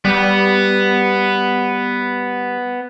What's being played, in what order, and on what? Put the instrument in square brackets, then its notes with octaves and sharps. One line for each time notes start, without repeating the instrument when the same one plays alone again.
[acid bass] G3 [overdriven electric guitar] B3